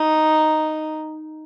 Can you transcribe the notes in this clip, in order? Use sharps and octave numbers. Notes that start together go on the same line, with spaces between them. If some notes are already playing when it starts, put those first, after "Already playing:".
Already playing: D#4